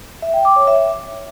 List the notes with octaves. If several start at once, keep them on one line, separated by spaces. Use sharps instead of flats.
E5
G5
D6
C#5
E5